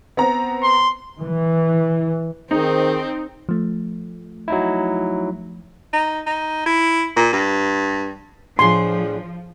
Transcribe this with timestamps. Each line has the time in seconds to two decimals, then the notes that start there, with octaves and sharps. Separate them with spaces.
0.17 B3 C4 A#5
0.63 C6
1.20 E3
2.51 D#3 C4 D#4 G#4 C5
3.49 F3 A3
4.48 F#3 D#4 E4
5.93 D#4
6.26 D#4
6.66 E4
7.16 A#2
7.33 G2
8.59 A2 F3 D4 G#4 C6